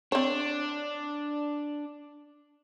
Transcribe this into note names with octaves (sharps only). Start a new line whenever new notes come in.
C4 D4 C#5